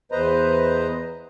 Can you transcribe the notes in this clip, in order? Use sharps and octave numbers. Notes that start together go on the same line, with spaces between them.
E2 B4 C5 D#5 A#5